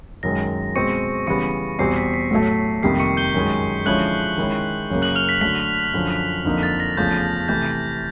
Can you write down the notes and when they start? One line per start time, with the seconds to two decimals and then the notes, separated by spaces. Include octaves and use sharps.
0.23 F#2 D#3 G#3 A#6
0.75 B2 G#3 C4 C#6 C#7
1.27 C#3 E3 G3 B3 C#6 C#7
1.79 E2 B2 G3 C4 C7
1.96 B6
2.14 B6
2.31 A2 F#3 A3
2.83 F2 C3 D#3 G3 A#3 C7
3.00 C#6 C#7
3.17 G6 G7
3.34 F#2 D#3 G#3
3.86 D3 F3 G#3 C#4 E4 F#6 F#7
4.38 D#3 G#3 C#4 E4
4.90 F#2 C#3 F#3 A#3
5.02 F#6 F#7
5.15 F6 F7
5.29 B6
5.41 D3 F#3 A3 B6
5.94 F#2 D3 F3
6.45 F2 D3 F3 A#3 D#4
6.63 A6
6.80 A#6
6.97 E2 C#3 F3 A3 G6
7.48 C3 E3 A3 G6